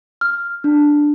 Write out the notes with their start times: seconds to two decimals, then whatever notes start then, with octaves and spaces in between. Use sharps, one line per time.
0.21 F6
0.64 D4